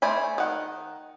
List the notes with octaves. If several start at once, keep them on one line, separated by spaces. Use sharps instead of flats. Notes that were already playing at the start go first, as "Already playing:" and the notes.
A3 C5 D5 G#5 B5
D#3 F#5